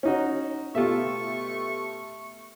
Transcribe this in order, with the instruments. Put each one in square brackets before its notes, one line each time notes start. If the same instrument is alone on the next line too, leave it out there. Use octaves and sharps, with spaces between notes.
[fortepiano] C#4 D#4 F#4
[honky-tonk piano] B2 G4 [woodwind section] A3 C#6 [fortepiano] F4 A4 E5